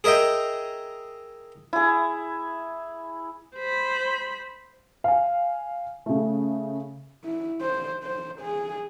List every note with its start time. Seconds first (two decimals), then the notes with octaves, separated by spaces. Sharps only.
0.04 G#4 A#4 D#5 E5 G5
1.73 E4 G#4
3.56 C5 B5
5.04 F5 G#5
6.06 C#3 A3
7.24 E4
7.61 C5
8.04 C5
8.41 G#4